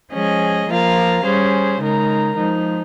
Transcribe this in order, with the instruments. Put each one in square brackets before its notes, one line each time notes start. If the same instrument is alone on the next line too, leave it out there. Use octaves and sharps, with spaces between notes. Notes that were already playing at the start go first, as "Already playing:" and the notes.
[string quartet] F3 G#3 C#4 G#4 D#5
F3 A#3 F4 A#4 F5
G3 C#4 G#4 C5
C#3 G#3 D#4 A#4
F3 G#3 D#4